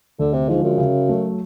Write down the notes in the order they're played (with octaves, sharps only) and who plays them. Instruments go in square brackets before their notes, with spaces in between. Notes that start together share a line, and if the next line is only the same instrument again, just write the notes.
[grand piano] D2 [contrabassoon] D3
[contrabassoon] C3
[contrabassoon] G#2 [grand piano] D3 F3 G#3
[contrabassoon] F#2
[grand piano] C#3
F#3 A3